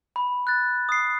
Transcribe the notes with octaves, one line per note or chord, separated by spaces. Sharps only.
B5
F#6 A6
D#6 C7